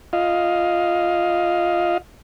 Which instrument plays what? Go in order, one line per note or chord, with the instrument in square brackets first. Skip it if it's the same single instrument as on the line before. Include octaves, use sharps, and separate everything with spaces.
[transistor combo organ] F4 D#5 F5